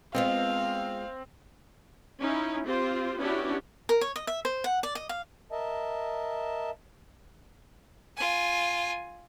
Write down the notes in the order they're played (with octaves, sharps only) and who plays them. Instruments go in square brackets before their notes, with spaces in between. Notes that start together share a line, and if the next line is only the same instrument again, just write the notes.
[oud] G#3 B3 F4 [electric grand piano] C4 [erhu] F5
[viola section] C#4 D#4 E4
C4 F4 G4 C5
B3 C#4 D4 E4 F#4 G4
[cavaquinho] A#4
C#5
D#5
E5
C5
F#5
D5
D#5
F5
[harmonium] A#4 D#5 E5 A5
[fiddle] F4 G#5